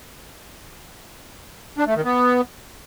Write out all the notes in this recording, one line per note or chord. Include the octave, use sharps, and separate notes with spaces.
D4
A3
D#3
B3